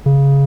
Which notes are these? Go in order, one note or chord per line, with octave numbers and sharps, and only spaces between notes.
C#3